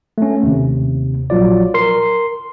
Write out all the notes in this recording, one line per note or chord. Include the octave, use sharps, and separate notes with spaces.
A3 C#4
D#2 C3
A#1 F#3 F4 D5
A#4 C6 C7